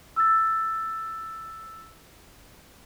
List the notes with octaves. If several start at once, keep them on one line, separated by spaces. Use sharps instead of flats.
E6 A6